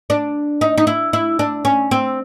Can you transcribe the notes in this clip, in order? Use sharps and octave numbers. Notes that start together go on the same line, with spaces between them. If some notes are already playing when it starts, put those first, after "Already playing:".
D4
D#4
D#4
E4
E4
D4
C#4
C4